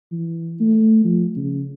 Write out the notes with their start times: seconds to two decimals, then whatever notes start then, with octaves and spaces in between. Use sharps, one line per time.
0.12 E3
0.61 A3
1.04 F3
1.36 C#3